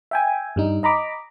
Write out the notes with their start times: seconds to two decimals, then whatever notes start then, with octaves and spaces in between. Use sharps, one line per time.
0.11 E5 G5 G#5
0.56 G2 G3 D#4
0.83 D#5 A#5 B5 D6